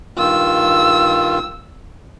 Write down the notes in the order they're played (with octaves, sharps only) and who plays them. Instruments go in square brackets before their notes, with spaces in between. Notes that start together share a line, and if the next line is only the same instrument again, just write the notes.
[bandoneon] G2 D#3 F4 [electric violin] E6